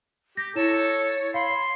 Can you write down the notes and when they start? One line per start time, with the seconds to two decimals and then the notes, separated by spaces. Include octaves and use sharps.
0.37 G4 A#6
0.56 E4 A4 C#5 E7
1.34 F5 B5 C6